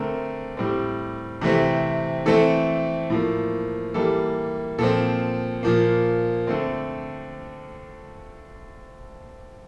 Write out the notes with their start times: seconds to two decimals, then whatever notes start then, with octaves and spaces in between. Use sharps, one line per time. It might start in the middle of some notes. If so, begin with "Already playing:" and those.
Already playing: D3 A3 C4 A#4
0.57 A2 G3 C4
1.41 C3 E3 A3 C4
2.26 E3 A3 C4 A4
3.10 A2 F3 A#3
3.94 E3 G3 A#3 A4
4.79 A#2 F3 C4 A4
5.63 A#2 F3 A#3
6.47 D3 A3 C4